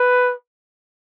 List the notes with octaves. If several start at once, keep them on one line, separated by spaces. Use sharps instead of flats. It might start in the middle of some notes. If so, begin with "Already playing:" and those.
Already playing: B4